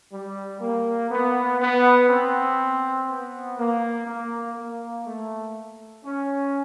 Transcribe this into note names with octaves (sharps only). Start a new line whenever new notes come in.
G3
A#3
B3
B3
C4
B3
A#3
A#3
A#3
A3
C#4